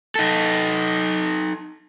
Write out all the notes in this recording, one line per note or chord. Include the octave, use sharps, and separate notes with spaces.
D#4 A4